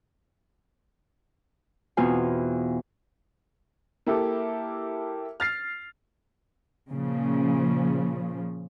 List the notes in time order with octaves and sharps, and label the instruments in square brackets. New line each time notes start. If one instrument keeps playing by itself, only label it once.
[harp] E2 B2 C4 F4 G#5
[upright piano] A#3 E4 G4 A4
F6 A6 C7
[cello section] A#2 C#3 F3